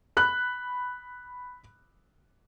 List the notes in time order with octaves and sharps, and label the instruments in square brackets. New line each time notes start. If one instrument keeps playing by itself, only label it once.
[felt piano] B5 F#6